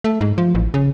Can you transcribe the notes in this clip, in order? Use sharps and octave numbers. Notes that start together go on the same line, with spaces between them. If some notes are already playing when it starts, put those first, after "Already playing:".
A3
G#2
F3
A1
C#3